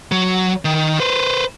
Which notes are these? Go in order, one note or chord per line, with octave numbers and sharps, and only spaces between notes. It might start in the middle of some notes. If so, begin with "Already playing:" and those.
F#3
D#3
B4 C5